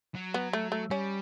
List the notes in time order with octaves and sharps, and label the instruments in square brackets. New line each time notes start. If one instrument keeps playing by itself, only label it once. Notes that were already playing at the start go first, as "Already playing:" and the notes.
[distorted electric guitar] F#3
[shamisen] B3
A3
A3
[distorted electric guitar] G3 [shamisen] C#4